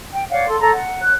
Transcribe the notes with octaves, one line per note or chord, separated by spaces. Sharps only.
G5
C#5 D5 F5 F#5
A4 C6
A4 C#5 A#5
F#5
C#5 F#6